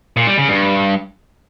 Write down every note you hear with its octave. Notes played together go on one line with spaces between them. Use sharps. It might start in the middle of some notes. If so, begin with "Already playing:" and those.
A#2
G3
C#3
G2